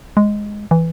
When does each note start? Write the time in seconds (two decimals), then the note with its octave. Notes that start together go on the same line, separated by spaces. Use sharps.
0.17 G#3
0.71 E3